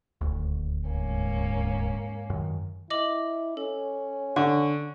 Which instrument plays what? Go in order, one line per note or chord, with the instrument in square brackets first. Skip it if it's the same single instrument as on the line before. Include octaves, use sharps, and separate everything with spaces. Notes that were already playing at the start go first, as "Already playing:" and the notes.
[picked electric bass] D#1 D2
[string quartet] G#2 A#3 C#4
[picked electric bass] F#2 D#3
[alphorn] E4 [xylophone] D#5 D6 F#7
[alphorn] C#4 [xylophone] A4
[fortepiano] D3 [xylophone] C#6